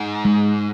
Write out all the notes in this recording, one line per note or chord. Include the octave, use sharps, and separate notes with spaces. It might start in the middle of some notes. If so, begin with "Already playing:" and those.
Already playing: G#2
G#3